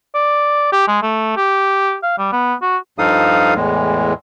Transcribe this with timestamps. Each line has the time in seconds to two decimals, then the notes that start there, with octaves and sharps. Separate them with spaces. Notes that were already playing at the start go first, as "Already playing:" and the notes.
0.14 D5
0.72 G4
0.88 G#3
1.02 A3
1.37 G4
2.03 F5
2.18 G3
2.32 B3
2.62 F#4
2.99 G2 F3 D#4 A4 F5 D#6
3.55 E2 A2 E3 G#3